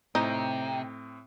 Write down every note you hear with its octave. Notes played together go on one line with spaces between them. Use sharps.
A2 C3 C4 D#4 G5 A#5